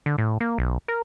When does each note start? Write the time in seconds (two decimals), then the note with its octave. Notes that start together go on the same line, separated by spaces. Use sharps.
0.06 D3
0.18 A2
0.40 A#3
0.58 B1
0.88 A#4